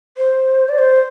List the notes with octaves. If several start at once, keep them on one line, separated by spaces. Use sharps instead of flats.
C5
D5
C5